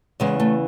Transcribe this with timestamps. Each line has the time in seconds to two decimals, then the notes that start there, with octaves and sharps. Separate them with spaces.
0.20 E2 C#3 E3 G#3
0.40 A3